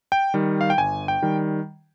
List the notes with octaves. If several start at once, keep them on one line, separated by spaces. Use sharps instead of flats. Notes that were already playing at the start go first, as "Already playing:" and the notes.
G5
D#3 G3
F5
G5
G1 G#5
G5
D#3 G3